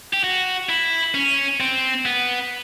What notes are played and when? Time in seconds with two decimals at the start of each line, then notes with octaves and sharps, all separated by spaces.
0.13 G4
0.24 F#4
0.69 E4
1.15 C#4
1.60 C4
2.06 B3